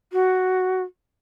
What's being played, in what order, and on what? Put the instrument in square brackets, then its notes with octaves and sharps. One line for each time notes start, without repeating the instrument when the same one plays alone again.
[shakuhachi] F#4